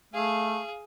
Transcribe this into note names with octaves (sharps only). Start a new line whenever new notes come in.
A3 G#4 F5